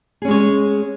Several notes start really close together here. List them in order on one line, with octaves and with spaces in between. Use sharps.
G#4 C#4 G#3 C#5